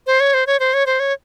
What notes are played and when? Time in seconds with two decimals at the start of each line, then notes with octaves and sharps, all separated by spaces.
0.07 C5
0.20 C#5
0.34 C5
0.47 C#5
0.60 C5
0.74 C#5
0.86 C5
1.00 C#5